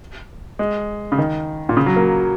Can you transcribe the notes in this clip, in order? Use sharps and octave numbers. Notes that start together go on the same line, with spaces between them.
G#3
C#3
D#3
A#2
C#3
F#3
A#3